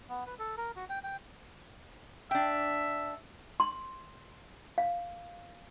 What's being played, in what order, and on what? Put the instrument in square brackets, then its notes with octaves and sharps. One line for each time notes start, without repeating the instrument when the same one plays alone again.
[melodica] B3
B4
A4
A#4
F#4
G5
G5
[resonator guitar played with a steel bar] D4 G5 [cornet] E5
[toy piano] C6
F5